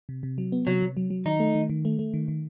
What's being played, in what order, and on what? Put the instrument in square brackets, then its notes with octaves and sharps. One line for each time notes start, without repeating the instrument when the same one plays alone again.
[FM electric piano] C3
C3
F#3
B3
[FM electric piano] C3 [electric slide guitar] F#3
[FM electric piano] C3
F#3
F#3
[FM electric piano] D#3 [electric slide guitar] D#4
[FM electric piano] A3
D#3
D#3
A3
A3
D#3
D#3